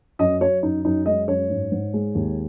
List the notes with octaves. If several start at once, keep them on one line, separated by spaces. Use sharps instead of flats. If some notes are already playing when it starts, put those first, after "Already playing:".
F#2 D#5
F#3 C#5
F#2 D#4
F#2 D#4
G#3 D#5
F#2 C#5
G#2
G#2
G#3
D#2